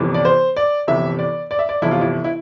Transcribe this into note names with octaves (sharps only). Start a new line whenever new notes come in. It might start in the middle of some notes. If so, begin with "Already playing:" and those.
Already playing: G1 F2 C3 E3
D5
C5
D5
G1 F2 C3 E3 E5
D5
D5
E5
D5
G1 F2 C3 E3 E4
F4
E4
E4